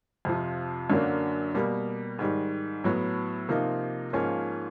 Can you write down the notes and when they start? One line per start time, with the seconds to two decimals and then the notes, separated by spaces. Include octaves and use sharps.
0.25 F2 C3 F3
0.90 F#2 D3 F#3 A#3 D4
1.55 B2 G3 A#3
2.19 G#2 D#3 G3
2.84 A2 F#3 B3
3.49 C3 F3 A#3 D#4
4.13 G#2 F3 A#3 C#4 F4